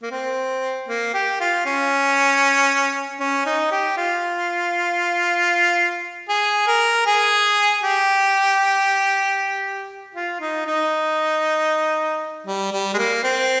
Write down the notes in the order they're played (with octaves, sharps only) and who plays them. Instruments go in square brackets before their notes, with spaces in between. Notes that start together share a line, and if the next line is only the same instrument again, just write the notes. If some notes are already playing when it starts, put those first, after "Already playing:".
[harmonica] A#3
C4
A#3
G4
F4
C#4
C#4
D#4
G4
F4
G#4
A#4
G#4
G4
F4
D#4
D#4
G3
G3
G#3
A#3
C4